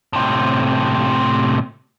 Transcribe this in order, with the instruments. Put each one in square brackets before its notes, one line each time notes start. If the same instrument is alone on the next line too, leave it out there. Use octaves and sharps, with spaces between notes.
[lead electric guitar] A2 C3